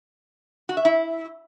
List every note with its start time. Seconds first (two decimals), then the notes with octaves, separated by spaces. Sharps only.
0.69 F#4
0.77 E5
0.85 E4